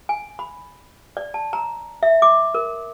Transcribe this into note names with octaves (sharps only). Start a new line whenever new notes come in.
G#5
B5
D5
A5
A#5
E5
D6
A#4